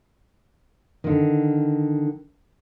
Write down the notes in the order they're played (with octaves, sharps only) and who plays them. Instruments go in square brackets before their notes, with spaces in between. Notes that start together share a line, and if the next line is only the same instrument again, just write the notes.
[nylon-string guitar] D3 D#3